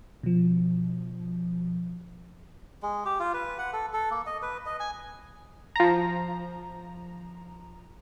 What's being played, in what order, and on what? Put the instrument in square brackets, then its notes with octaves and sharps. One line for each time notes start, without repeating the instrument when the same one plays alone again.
[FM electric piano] B2 F3
[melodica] G#3
G4
F4
B4
F#5
A4
A4
A#3
D#5
B4
D#5
G#5
[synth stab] F3 A#5